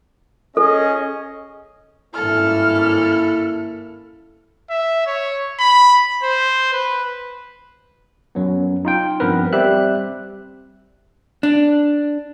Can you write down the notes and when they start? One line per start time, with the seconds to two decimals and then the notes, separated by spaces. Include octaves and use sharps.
0.57 C#4 G#4 A4 D#5
2.14 G#1 G2 A#3 C#4 E4 A4 F6
4.70 E5
5.07 C#5
5.60 B5
6.23 C5
6.73 B4
8.35 F#2 F#3 B3
8.85 D#4 F4 G5
9.20 G2 F3 B3 C4 A#4 B4
9.53 G3 C4 G4 E5 F#6
11.43 D4